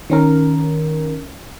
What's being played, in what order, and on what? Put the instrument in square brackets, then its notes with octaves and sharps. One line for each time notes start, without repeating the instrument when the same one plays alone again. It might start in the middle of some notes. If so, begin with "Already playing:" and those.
[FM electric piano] D#3 C#4 A#4